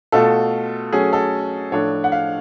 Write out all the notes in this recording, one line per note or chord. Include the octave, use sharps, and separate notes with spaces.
B2 A3 F4 A4
F#3 A3 C#4 G#4
A4
A2 F3 A3 D4 C#5
F#5
F5